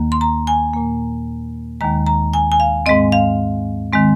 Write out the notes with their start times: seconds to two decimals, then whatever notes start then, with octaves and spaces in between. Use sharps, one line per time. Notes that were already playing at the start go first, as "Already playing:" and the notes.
Already playing: D#2 D#3 A#3
0.12 C6
0.21 A#5
0.47 G#5
0.73 A#2 A#3
1.81 D#2 D#3 G#3 A#5
2.07 A#5
2.34 G#5
2.52 G#5
2.60 F5
2.86 G#2 G#3 C4 D#5
3.12 F5
3.93 D#3 G#3 C4